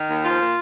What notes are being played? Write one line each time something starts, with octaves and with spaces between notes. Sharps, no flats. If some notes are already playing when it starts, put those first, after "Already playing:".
Already playing: D#3
D#2
F3 F4
A#2